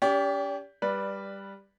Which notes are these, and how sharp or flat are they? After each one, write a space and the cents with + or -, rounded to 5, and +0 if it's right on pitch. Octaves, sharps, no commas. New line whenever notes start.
C#4 +35 G4 +10 D5 -40
G3 +10 B4 -10 D5 +0